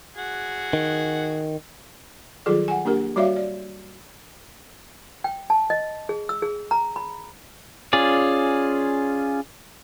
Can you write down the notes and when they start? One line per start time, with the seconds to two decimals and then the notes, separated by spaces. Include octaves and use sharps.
0.16 F#4 G#4 F#5
0.73 D#3
2.46 D#3 F#3 G3 F4 G#4 A4
2.68 F#5 G#5
2.85 A#3 D4 G4 A#4
3.16 G3 F#4 C#5 D5 E5 F5
3.36 D5
5.24 G5
5.50 A5
5.70 D#5
6.09 G#4
6.29 E6
6.42 G#4
6.71 A#5
6.96 B5
7.93 C#4 F4 G#4 D5